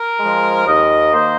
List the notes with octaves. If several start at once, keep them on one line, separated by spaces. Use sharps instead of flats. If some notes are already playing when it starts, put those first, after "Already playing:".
Already playing: A#4
F3 G#3
D#2 D#5
D#3 A#3 C5